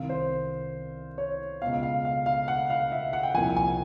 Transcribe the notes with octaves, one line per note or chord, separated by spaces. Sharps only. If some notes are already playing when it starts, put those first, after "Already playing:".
Already playing: C2 C3 D#3 F5
C5
C#5
C#2 B2 F5
F5
F5
F5
F#5
F5
E5
F#5
G5
C2 A#2 F3 G#5
G#5